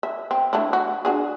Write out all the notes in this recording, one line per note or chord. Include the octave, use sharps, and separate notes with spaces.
E5
C4
A3 D4 E4
F#4
D4 F#4 G#4